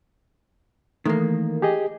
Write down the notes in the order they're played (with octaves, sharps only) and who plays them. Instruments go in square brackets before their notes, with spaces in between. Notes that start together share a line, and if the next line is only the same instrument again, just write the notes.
[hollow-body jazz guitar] D#3 A#3 [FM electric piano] E3 A3
[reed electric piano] G4 G#4 D#5